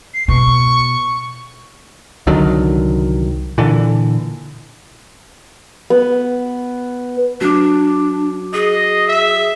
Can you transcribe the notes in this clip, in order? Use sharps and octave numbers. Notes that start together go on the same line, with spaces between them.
C7
B2 C#6
C2 D3 D#3 F#3
A#2 D3 E3
B3
F#3 D4 D6
G#4 D#5
E5